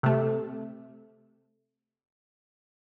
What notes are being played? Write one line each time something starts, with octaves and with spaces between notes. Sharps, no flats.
C3 A3